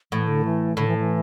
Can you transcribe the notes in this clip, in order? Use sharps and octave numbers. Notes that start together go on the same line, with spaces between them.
A2 E3
D3
E3
A2 D3
E3
E3